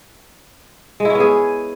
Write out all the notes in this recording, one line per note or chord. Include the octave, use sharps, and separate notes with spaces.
G#3
E4
C#4
B3
G#4